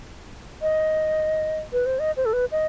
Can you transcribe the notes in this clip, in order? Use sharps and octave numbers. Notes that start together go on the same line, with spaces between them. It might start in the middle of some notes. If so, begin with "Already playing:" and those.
D#5
B4
C5
D#5
C5
A4
B4
D#5